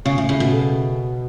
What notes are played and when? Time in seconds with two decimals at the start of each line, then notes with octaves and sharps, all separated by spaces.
0.05 C#3 C#4
0.18 A2
0.29 A2 C#3
0.40 B2
0.53 A4